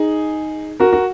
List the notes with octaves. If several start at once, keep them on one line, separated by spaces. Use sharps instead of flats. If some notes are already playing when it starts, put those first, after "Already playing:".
Already playing: D#4 G#4
F#4 A#4
F#4